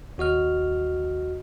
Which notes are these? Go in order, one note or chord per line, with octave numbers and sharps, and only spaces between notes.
D#2 F#4 D#5 F6